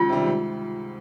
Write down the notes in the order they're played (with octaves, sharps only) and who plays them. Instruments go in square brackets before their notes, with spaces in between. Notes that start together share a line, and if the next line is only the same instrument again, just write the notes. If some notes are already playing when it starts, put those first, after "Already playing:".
Already playing: [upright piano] C#2 [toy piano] F4
[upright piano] C3 D#3 G3
G#2